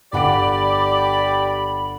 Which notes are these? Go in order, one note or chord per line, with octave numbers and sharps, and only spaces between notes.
G1 G4 D5 F#5 B5 D7